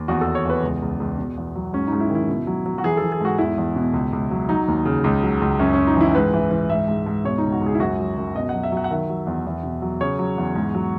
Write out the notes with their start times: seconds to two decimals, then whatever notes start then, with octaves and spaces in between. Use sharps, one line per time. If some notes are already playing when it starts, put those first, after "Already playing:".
Already playing: D#2
0.08 E2 F#4
0.21 A4
0.27 E2
0.35 C#5
0.45 E2 B4
0.63 C#2
0.82 C#2
1.00 C#2
1.18 B2
1.37 E2
1.55 F#3
1.73 G#2 C#4
1.87 D#4
1.92 G#2
2.00 E4
2.10 D#3
2.15 E4
2.28 B2
2.47 F#3
2.66 F#3
2.78 F#4
2.84 E3 G#4
2.97 E3 A4
3.12 G#4
3.21 G#2 F#4
3.38 E2 E4
3.58 E2
3.76 B2
3.93 C#2
4.13 C#2
4.31 F#3
4.49 F#3 D#4
4.68 D#2
4.85 C#3
5.04 C#2
5.23 F#3
5.41 C#2
5.59 F#2 C#4
5.73 F#2 C#4
5.87 D#4
5.96 E3 E4
6.15 G#2 B4
6.34 E3
6.51 E3
6.70 G#2 E5
6.88 G#2
7.06 G#2
7.25 B2 C#5
7.38 D#4
7.43 C#2
7.52 F#4
7.61 C#2
7.66 G#4
7.75 E4
7.80 F#2 F#4
7.99 F#3
8.17 F#2
8.35 B2 D#5
8.49 F#5
8.54 F#3
8.63 E5
8.72 F#3 F#5
8.84 F#5
8.91 D#3 E5
9.09 F#3
9.27 E2
9.46 E2
9.63 B2
9.82 F#3
10.01 C#3 C#5
10.19 F#3
10.38 E2
10.55 G#2
10.75 F#3